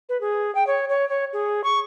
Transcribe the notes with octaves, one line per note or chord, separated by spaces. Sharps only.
B4
G#4
G5
C#5
C#5
C#5
G#4
C#6